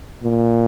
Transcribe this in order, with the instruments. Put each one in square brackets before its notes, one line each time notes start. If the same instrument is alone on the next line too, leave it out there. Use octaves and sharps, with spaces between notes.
[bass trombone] A#2